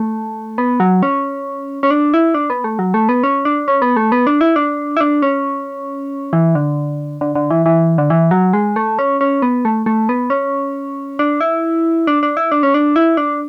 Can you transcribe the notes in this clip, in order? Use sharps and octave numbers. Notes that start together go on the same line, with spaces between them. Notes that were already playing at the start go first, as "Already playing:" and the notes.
Already playing: A3
B3
F#3
C#4
C#4
D4
E4
D4
B3
A3
F#3
A3
B3
C#4
D4
C#4
B3
A3
B3
D4
E4
D4
E4
D4
C#4
E3
D3
D3
D3
E3
E3
D3
E3
F#3
G#3
A3
C#4
C#4
B3
A3
A3
B3
C#4
D4
E4
D4
D4
E4
D4
C#4
D4
E4
D4